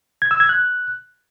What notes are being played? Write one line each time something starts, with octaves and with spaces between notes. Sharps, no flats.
G#6
E6
G#6
F#6